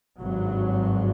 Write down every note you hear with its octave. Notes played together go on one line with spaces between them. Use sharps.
G#1 G2 F#3